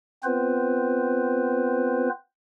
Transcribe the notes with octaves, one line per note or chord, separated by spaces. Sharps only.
B3 C4 F4 B4 C5